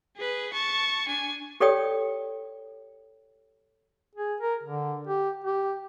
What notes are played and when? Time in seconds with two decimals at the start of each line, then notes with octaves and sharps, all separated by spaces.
0.16 G#4 B4
0.53 A5 C#6
1.08 D4 G#5
1.60 G4 A4 C#5 D5 G5 D#6
4.15 G#4
4.41 A#4
4.63 D3
5.07 G4
5.44 G4